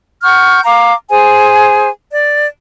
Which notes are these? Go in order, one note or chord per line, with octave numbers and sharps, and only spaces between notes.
F#5 C#6 F6 G6
F5 A#5 D6
G#4 C5 G#5
D5